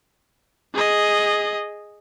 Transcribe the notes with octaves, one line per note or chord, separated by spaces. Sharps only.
G#4 D#5